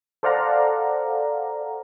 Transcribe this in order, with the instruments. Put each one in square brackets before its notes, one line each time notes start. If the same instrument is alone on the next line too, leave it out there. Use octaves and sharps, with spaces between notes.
[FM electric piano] A4 C5 D5 F5 F#5 A#5